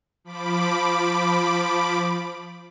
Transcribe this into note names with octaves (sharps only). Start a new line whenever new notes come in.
F3 B5 D6